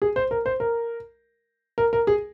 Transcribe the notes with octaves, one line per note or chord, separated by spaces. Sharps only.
G#4
C5
A#4
C5
A#4
A#4
A#4
G#4